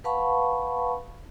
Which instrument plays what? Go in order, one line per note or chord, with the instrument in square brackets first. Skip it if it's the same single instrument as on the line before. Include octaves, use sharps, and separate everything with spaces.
[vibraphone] B4 F5 F#5 A5 B5 C#6